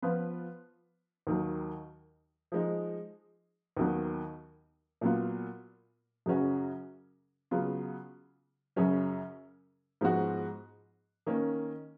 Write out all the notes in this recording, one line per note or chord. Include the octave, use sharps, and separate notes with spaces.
F3 B3 F4 B4
D#2 D#3 F#3
F3 G#3 D#4
D#2 D#3 F#3 B3
A#2 F#3 B3 F4
F#2 C#3 F#3 C#4 F#4
C#3 F#3 B3 F4
F#2 C#3 F#3 C#4
G#2 F3 G#3 B3 F#4
D#3 A#3 C#4